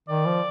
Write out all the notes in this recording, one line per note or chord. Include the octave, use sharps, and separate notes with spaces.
D#3 D5
F3